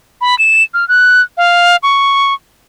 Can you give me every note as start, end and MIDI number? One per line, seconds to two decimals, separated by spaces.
0.21 0.37 83
0.39 0.63 100
0.74 0.87 89
0.88 1.21 90
1.37 1.76 77
1.83 2.33 85